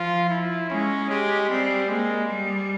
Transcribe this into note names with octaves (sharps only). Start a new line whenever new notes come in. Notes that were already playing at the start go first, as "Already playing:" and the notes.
Already playing: F3 F4
E4
G#3 C#4
G#3 G4
G3 C4
G#3 A#3
G3